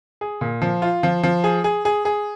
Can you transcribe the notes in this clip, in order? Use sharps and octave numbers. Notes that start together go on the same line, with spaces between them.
G#4
A#2
F3
F4
F3
F3
G#4
G#4
G#4
G#4